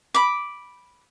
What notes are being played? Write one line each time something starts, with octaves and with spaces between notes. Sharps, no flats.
B5 D6